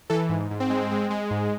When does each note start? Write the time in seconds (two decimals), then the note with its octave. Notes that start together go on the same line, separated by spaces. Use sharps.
0.10 E3 A4
0.29 G#2
0.51 G#2
0.60 C4
0.70 G#3
0.91 G#3
1.10 G#3
1.31 G#2